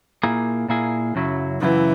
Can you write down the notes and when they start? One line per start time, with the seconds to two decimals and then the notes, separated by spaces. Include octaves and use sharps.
0.23 A#2 A#3 E4 G#4
0.68 A#2 A#3 E4 G#4
1.15 F#2 C#3 F#3 E4
1.61 F#2 C#3 E3 F#3 E4